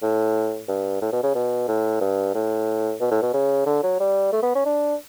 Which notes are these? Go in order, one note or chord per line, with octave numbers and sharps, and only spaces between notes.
A2
G2
A2
B2
C#3
B2
A2
G2
A2
B2
A2
B2
C#3
D3
F#3
G3
A3
B3
C#4
D4